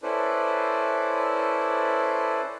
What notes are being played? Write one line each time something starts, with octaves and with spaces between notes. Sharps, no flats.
C#4 E4 A4 B4 C5 D5